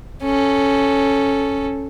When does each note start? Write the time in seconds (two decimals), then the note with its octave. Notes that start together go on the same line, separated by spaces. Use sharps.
0.23 C#4 A4